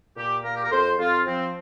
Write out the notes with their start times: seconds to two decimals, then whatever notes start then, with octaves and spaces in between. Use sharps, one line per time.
0.16 A#2 G4
0.44 A#3 A#4
0.55 G4
0.63 A#4
0.71 F2 C5
0.99 F2 F4
1.26 F3 C4